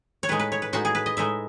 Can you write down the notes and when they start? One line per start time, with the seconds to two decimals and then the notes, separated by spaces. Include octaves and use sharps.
0.23 C#5
0.28 A2 G#3 D#4 B4
0.39 B4
0.52 C#5
0.62 B4
0.73 A2 G#3 D#4 F#4
0.85 G#4
0.95 B4
1.06 D#5
1.17 A2 G#3 D#4 E5